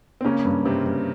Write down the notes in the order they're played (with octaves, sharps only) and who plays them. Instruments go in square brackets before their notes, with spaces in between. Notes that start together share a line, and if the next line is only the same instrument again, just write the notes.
[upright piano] C4
[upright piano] C#3 C#4 [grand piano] A#3
[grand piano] G2
[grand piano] G2 [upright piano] C3 C4
[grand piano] G2